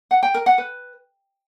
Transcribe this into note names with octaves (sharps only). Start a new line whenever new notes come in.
F#5
G5
A#4
F#5
B4